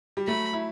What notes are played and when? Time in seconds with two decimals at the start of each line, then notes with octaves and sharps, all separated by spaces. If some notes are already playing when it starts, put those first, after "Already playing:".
0.17 G3
0.27 F#3 A3 B5
0.53 E4